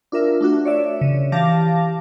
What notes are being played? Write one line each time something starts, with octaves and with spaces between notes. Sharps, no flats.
D4 F4 A#4 E5
A3 D4 F#4
C#5 D5 E5
C#3
E3 G4 F5 A5 D6 A#6